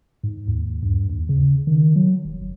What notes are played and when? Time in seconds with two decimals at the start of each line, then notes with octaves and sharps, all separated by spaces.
0.24 G#2
0.47 D#2
0.83 G2
1.09 D#2
1.29 C#3
1.67 D#3
1.96 F#3
2.25 E1
2.41 F#1